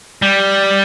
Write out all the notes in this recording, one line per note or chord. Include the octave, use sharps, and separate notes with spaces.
G3